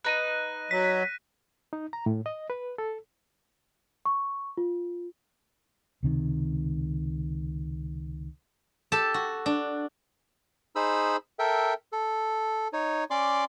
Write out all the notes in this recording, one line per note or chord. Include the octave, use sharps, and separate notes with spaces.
D#4 B4 F#6 A#6 D#7
F#3 B6
D#4
A#5
A2
D#5
B4
A4
C#6
F4
C#2 C3 D#3
G4 A4 A5
F#4
D4
D#4 G#4 C5 B5 E6
A4 A#4 E5 G5
A4
D#4 C#5
C#4 D5 C6 D6